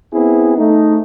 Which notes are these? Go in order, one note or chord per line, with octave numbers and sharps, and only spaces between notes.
B3 C4 E4 G#4
A3 D#4